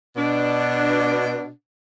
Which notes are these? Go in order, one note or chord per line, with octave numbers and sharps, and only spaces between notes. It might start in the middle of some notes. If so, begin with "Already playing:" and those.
B2 D4